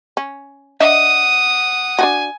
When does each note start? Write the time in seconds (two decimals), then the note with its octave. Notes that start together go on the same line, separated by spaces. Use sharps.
0.17 C#4
0.80 D4 D#5 E5 F#5 D#6
1.99 D4 F4 F#4 G#5